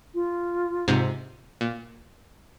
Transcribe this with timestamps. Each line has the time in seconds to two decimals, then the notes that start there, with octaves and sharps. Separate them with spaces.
0.14 F4
0.88 G#2 C3
1.61 A#2